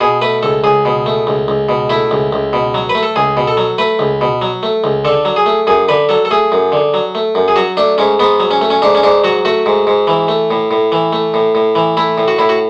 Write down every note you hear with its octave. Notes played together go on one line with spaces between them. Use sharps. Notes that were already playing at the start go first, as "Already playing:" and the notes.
B2 G#4
A3 B4
C#2 A4
C#2 G#4
B2
A3
C#2
C#2
B2
A3 E4
C#2
C#2
B2
F#3
B4
A3
A4
C#2 G#4
B2
A4
F#3
A3 B4
C#2
B2
F#3
A3
C#2
D3 A4
F#3
G#4
A3
F#2 G#4
D3 B4
F#3 A4
A4
A3 G#4
F#2
D3
F#3
A3
F#2
G#4
F#3 F#4
A3 D4
G#2 C#4
G#2 B3
F#3
C#4
A3
C#4
G#2 D4
C#4
G#2 D4
F#3 F#4
A3 F#4
G#2
G#2
E3
A3
A2
A2
E3
A3
A2
A2
E3
A3 E4
A2
F#4
A2 E4
F#4